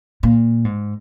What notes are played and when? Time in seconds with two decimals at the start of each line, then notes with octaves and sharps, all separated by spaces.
0.23 A#2
0.65 G#2